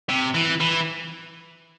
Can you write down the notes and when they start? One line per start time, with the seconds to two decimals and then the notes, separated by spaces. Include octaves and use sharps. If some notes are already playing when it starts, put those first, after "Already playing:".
0.09 C3
0.35 E3
0.61 E3